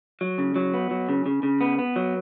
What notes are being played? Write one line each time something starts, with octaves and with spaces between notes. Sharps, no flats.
F#3
C#3
F#3
B3
F#3
C#3
C#3
C#3
B3
B3
F#3